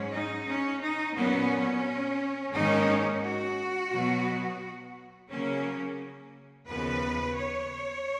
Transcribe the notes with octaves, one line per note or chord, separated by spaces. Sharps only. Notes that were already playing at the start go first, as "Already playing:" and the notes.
Already playing: G#2 F#3 C#4
D#4
C#4
D#4
A#2 F#3 B3 C#4
G#2 D#3 A#3 C#4 D#4
F#4
B2 F#3 B3
C#3 F#3 A#3 C#4
D#2 C#3 F3 B3 B4
C#5